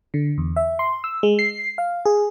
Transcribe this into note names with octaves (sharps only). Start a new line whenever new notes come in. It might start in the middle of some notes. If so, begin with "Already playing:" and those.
D3
E2
E5
C6
E6
G#3
C7
F5
G#4